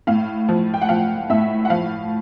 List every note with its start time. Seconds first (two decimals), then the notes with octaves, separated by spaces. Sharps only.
0.07 A2 F5
0.49 F3
0.74 G5
0.82 F#5
0.89 F3 F5
1.30 A2 E5
1.65 F#5
1.70 F3 F5